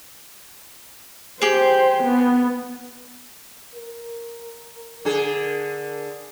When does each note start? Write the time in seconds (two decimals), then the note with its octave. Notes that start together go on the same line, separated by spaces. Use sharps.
1.42 G4 G#4 C5
2.03 B3
3.75 A#4
5.05 D3 G#4